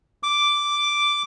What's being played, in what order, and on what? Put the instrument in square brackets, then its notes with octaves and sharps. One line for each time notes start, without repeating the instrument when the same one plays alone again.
[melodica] D6